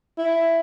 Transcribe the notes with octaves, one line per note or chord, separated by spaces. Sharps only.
E4